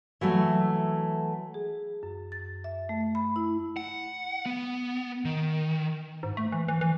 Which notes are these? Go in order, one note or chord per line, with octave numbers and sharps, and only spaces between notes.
E3 F#3 A3
G#4
F#2
A6
E5
A3
B5
E4
F#5
B3
D#3
G#2
A3
E3
E3
E3